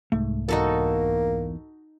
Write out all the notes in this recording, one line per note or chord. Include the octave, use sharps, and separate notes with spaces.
C2 G#2 A3
E2 A#3 D#4 F#4 A4 A#5